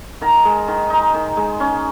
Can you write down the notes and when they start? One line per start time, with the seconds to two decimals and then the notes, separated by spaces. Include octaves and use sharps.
0.21 D#3 A#5
0.45 G#3
0.68 D#3
0.90 D#4
1.14 D#3
1.37 G#3
1.60 C#4